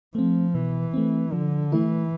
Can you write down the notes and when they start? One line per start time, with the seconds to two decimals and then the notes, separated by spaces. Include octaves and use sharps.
0.15 F3 A3 C4
0.54 B2 E3
0.94 A3 C4
1.32 D3 F3
1.72 E3 A3 E4